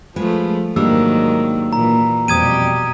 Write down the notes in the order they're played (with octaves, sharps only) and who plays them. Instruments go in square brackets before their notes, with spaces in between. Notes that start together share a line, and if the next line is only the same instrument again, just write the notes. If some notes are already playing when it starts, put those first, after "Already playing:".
[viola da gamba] F3 A3 [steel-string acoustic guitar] G#3 B4
[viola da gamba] G#2 D#3 F#3 [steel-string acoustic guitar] G3 A#3 D4 [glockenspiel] E6
[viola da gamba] A#2 E3 [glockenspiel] A#5
[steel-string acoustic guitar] F2 [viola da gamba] B2 G3 G4 [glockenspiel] D#6 G#6 D#7